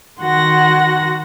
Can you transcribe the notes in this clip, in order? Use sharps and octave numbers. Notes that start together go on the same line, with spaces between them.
D#3 F#4 F#5 C6 A#6